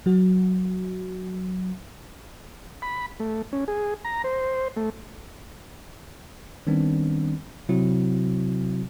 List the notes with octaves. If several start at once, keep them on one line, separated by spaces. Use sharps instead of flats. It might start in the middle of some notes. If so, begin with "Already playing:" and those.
F#3 F#4
B5
A3
C#4
G#4
A#5
C5
A3
D#3 G3 B3 C4 D4
C3 F#3 C4 E4 F#4